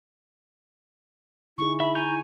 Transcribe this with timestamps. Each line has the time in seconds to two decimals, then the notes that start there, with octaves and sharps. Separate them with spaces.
1.58 D3 D#4 E4 G#4 C#6
1.80 E5 B5
1.95 G#5 A#5 C#6 G6